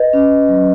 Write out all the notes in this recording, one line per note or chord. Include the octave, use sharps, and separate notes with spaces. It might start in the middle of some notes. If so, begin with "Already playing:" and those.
Already playing: B4 D#5
C#4
F#3